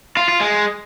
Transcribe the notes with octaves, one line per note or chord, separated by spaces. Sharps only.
F4
F4
G#3